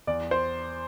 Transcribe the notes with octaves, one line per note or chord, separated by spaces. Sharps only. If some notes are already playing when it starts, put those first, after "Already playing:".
E2 D5
C5